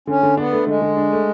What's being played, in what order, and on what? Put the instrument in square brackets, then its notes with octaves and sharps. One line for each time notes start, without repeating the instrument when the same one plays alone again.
[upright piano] D3 [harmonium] C#4
[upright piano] D3
[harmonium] B3 [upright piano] D4
[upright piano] A3
[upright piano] D3 [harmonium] G#3
[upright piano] D3
D4
A3